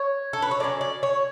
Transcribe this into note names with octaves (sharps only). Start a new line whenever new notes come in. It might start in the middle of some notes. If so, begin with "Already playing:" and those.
Already playing: C#5
A4
B4
C#5
D3 F#3 C#4 D5
D5
C#5